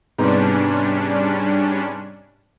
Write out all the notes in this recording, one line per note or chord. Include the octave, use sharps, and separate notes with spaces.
G#2 C3 G3 B3 C#4 D4